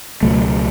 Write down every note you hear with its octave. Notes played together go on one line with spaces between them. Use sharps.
C#2 B2 F#3 A3